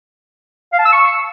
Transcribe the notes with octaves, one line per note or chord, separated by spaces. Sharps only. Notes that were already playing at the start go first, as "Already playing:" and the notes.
F5
A5
E6
C#6